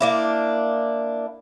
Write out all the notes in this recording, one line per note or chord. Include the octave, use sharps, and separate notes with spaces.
A#3 D4 E4